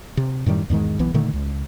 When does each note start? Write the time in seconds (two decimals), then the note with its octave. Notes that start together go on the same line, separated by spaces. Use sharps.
0.17 C3
0.46 F#2 A2 D#3 G3
0.70 E2 G#2 D#3 G#3
0.99 B1 E3 B3
1.14 A#2 D3 D#3 A3
1.33 C#2